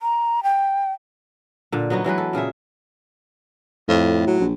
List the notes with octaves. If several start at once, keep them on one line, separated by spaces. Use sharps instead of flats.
A#5
G5
A#2 D3
F#3 B3 D#4 F#4
E3 F#3 G#3 B4
A4
A#2 C#3 G#4 E5
F2 A2
F#3
A#1